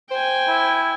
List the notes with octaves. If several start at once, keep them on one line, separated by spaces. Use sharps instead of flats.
C5 G5 G#5
E4